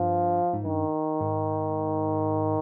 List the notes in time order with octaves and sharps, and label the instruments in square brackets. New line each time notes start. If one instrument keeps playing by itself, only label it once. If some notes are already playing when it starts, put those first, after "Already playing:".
Already playing: [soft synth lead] G2 [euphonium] F3
[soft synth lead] G#2
[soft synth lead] G2 [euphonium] D#3
[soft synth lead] G#2